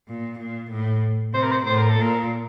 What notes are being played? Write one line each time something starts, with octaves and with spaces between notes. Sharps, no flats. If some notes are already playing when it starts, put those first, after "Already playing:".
A#2
A#2
A2
C3 C5
A#4
C5
A2 C5
A#4
A4
A#2 A#4